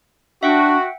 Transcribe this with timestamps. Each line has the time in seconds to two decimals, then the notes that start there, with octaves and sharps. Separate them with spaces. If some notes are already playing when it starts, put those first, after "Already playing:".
0.43 D4 F#4 E5 F#5 G5